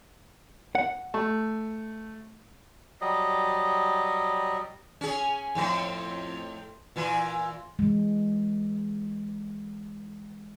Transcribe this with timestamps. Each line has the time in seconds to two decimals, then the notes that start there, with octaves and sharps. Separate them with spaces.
0.75 F#5
1.14 A3
3.01 F#3 G3 D#5
5.01 C#4 G#4
5.55 F2 A2 C4
6.96 A#2 E3 F4
7.79 E3 G#3